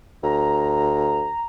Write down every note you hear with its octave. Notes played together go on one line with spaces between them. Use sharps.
D2 A#5